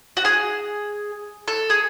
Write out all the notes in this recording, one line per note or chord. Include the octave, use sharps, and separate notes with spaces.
F#4
G#4
A4
G#4